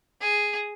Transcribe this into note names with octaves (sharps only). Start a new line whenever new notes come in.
G#4